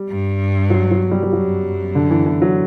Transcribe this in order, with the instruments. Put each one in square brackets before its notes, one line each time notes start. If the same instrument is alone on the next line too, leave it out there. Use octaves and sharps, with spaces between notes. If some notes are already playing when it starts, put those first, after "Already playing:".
Already playing: [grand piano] G3
[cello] G2
[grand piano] F#3
F#3
G3
G3
[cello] F#2 [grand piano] F#3
[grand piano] D3
E3
E3
F#3